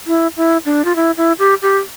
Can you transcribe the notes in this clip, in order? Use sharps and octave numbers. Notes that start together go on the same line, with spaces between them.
E4
E4
D4
F4
E4
E4
G4
G4